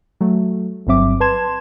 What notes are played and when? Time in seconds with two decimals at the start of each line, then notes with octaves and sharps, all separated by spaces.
0.21 F#3 A3
0.87 G1 G2 F#3 C4 E5 D6
1.20 B4 A5 C6 G#6 E7